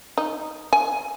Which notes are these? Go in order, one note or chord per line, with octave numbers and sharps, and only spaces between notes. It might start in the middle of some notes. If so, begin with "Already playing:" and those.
D#4
G#5